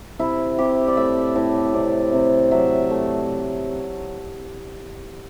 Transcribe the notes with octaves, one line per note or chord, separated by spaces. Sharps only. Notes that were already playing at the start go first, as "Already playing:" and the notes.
C3 E4
C3 G4
D5
A2 E5
A2
C3 D5
C3
F#3 E5
A3